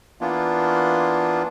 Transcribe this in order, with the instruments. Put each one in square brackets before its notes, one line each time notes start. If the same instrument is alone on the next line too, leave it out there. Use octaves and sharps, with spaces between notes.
[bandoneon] E3 A#3 B3 D4 F4